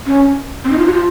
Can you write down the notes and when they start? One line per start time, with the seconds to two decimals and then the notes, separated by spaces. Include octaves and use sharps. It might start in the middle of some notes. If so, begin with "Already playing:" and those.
0.06 C#4
0.64 C4
0.72 D#4
0.79 F4
0.87 F#4
0.93 F4